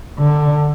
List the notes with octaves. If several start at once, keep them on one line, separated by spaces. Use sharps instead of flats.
D3